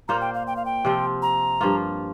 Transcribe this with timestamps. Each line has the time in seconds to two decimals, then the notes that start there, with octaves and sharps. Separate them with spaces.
0.08 A#2 A#3 F4 C5 A#5
0.21 G5
0.34 F5
0.47 G5
0.56 F5
0.65 G5
0.85 C3 F3 C4 F4
1.22 A#5
1.61 G2 F3 A#3 F4